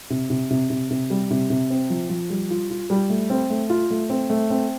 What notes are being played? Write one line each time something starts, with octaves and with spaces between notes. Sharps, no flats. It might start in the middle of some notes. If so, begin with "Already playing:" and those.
C3
C3
C3
C3
C3
G3
C3
C3
C4
F3
F3
G3
F4
F4
G3
A3
C4
A3
F4
A3
C4
A3
C4